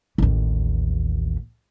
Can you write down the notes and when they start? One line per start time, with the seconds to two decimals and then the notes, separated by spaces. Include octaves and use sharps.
0.18 A1 D#2